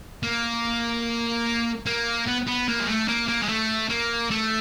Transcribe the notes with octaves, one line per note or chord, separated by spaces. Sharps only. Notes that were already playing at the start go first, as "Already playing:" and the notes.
A#3
A#3
B3
B3
A#3
G#3
A3
A#3
A#3
G#3
A3
A#3
A3